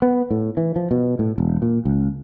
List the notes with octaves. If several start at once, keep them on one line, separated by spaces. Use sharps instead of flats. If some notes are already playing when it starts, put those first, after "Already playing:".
B3
A2
E3
F3
B2
A2
E1
A#2
C#2